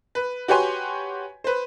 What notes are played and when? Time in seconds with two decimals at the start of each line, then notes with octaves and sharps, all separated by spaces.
0.15 B4
0.48 F#4 G4 B4 C#5 G#5 C6
1.44 B4 C5